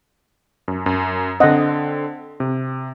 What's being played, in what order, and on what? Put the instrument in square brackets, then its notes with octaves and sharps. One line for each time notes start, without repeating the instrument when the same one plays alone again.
[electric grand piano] F#2
F#2
[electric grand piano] D3 C4 [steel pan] D#5 F#5
[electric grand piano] C3